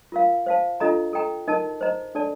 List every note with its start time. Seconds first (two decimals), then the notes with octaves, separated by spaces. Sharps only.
0.12 F4 A#4 F5
0.46 C5 F5 A5
0.80 D4 F4 A4 D#5 A#5
1.13 A4 D#5 G5 A#5
1.48 D#4 A#4 D#5 A5
1.81 C5 D#5 A#5
2.15 D4 A4 D5 A5